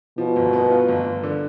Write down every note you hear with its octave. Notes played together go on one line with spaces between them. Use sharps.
B2 F3
G1
B3
F4
G1
G1
D3